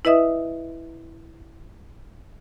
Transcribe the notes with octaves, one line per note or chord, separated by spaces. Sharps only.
E4 B4 D#5 E5 D#6